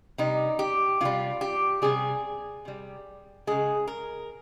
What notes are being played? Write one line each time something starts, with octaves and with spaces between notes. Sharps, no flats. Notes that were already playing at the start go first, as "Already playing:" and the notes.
C3 G3 D#4
G4
C3 G3 F4
G4
C3 G3 G#4
C3 G3
C#3 G#3 G#4
A#4